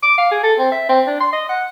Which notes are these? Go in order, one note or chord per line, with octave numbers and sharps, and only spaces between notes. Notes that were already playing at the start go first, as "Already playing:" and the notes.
D6
F5
G#4
A4
C4
E5
C4
D4
C6
D#5
F#5